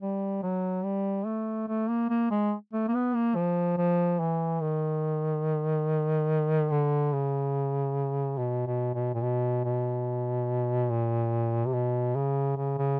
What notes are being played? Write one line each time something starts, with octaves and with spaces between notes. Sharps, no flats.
G3
F#3
G3
A3
A3
A#3
A#3
G#3
A3
A#3
B3
A#3
F3
F3
E3
D#3
D3
C#3
B2
B2
B2
A#2
B2
B2
A#2
C3
B2
C#3
C#3
C#3